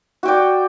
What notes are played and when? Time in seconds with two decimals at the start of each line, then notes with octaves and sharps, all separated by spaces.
0.23 F#4
0.25 G5
0.28 D5